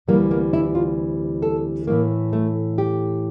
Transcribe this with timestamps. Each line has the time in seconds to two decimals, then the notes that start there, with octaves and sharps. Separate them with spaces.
0.08 D2 C3 E3 G3 A#3
0.31 A#3
0.53 E4
0.75 F4
1.42 A4
1.87 A2 E3 A3 A#3
2.33 A3
2.78 G4